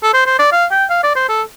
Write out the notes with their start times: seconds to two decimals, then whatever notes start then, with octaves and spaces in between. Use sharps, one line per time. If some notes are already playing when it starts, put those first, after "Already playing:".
0.03 A4
0.14 C5
0.26 C5
0.39 D5
0.52 F5
0.71 G5
0.90 F5
1.03 D5
1.16 C5
1.29 A4